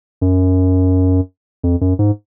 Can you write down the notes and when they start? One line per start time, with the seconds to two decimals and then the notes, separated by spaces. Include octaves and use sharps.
0.21 F#2
1.64 F2
1.81 F#2
1.99 G#2